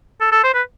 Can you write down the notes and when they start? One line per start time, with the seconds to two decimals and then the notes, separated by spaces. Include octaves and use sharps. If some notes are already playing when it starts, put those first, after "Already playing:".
0.21 A4
0.32 A4
0.43 C5
0.54 B4